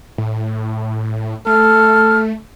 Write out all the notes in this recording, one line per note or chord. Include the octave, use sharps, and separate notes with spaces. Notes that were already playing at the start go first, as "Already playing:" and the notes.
A2
A3 A4 F6